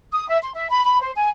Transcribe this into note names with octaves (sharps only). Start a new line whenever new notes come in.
D#6
E5
C6
E5
B5
B5
C5
G#5